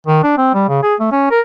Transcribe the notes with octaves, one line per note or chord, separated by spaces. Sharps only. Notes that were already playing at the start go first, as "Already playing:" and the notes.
D#3
D4
C4
G3
C#3
G#4
A3
C#4
A#4